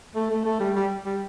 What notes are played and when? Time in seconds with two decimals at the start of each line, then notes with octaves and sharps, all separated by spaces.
0.16 A3
0.31 A3
0.45 A3
0.60 G3
0.76 G3
1.06 G3